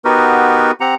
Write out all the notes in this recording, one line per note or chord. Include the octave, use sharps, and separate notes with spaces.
B3 D#4 F#4 G4 A#4 B4
C4 G4 F#5 A#5